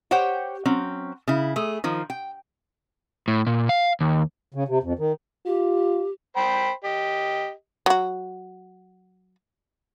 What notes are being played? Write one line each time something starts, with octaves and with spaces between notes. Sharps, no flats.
G4 C5 C#5 F#5 G5
F#3 C4 C#4
C#3 E4
A3 G#4
D#3 F3
G5
A2
A#2
F5
D#2
C#3
C3
F2
D#3
F4 G4
C5 G5 B5
G4 D#5
F#3 F#4